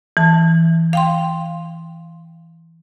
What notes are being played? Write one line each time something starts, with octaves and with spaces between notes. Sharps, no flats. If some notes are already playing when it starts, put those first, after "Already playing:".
E3 A5
F5 G5 C6